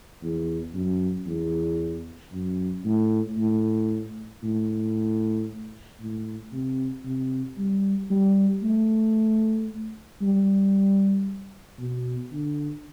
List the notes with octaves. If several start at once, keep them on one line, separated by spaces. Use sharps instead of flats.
E2
F#2
E2
F#2
A2
A2
A2
A2
C3
C3
G3
G3
A3
G3
B2
D3